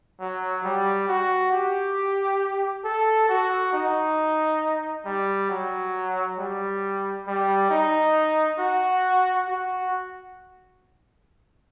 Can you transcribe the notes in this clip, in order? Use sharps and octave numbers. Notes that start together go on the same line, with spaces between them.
F#3
G3
F#4
G4
A4
F#4
D#4
G3
F#3
G3
G3
D#4
F#4
F#4